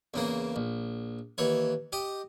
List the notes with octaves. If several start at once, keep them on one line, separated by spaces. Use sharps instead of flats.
E2 C#3 A#3
A#1
D#2 E3 C#5
G4 D#5